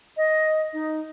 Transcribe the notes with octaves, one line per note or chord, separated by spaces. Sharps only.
D#5
D#4